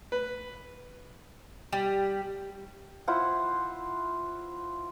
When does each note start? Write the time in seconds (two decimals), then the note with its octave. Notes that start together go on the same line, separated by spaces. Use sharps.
0.12 B4
1.72 G3
3.07 E4 F4 C5 F#5